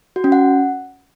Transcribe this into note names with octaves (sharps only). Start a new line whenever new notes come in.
F#4
C#4
F#5